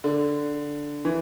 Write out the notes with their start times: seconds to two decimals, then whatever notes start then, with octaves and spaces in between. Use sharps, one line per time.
0.04 D3
1.05 E3